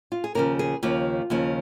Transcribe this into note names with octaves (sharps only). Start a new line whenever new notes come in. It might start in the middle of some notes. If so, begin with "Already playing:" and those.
F4
G#4
D#2 C#3 F3 A#4
G#4
D#2 C#3 F3 F4
D#2 C#3 F3